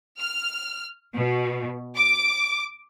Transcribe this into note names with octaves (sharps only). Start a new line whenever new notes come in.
F6
B2
D6